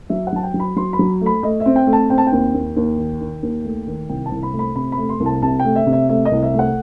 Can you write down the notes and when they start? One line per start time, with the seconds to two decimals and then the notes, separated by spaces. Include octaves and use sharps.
0.10 F#3 E5
0.27 F#5
0.32 F#3 A5
0.43 G5
0.54 F#3
0.60 B5
0.76 F#3 C6
0.93 B5
0.99 F#3
1.21 A3 B5
1.43 A3 D#5
1.60 E5
1.66 C4
1.76 G5
1.87 A3
1.93 A5
2.10 C4 G5
2.18 A5
2.27 G5
2.32 D#2
2.54 D#2
2.76 D#2
2.98 D#3
3.21 D#3
3.43 D#2
3.65 A3
3.87 D#3
4.09 C2 G5
4.26 A5
4.31 C2
4.43 B5
4.53 A3
4.59 B5
4.76 C3 B5
4.92 B5
4.98 A3
5.09 C6
5.20 C2
5.26 A5
5.42 C3 A5
5.59 G5
5.65 A3
5.76 E5
5.87 C3
5.93 E5
6.09 A3 E5
6.25 D#5
6.31 C2
6.43 E5
6.54 A3
6.59 F#5